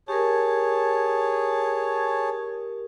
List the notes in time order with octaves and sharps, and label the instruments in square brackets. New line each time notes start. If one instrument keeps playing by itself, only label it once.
[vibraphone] G4 A#4 [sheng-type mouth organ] G#4 C#5 A5